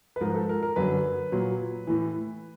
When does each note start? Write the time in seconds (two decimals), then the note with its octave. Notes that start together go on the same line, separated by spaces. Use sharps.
0.16 B4
0.21 G#2 F3 A#4
0.35 A4
0.49 A#4
0.63 A#4
0.76 F#2 D3 F#3 B4
1.32 A#2 F#3
1.87 A2 E3